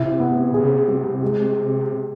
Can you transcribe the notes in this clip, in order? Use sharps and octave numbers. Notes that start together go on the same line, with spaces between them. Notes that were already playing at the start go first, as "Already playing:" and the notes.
Already playing: C3 E4
B3
C3 G#4
C#3
C3
G3
G#3